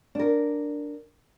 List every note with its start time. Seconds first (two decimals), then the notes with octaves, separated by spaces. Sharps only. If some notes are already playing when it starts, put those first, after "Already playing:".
0.15 D4 A#4